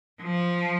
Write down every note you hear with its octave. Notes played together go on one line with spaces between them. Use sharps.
F3